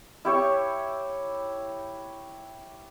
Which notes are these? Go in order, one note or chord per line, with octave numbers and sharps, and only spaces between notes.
E4 G4 C#5 C#6